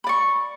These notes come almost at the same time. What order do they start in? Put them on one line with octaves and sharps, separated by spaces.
B5 D5 C#6